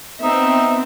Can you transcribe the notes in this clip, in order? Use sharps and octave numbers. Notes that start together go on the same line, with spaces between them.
B3 C4 D#4 E5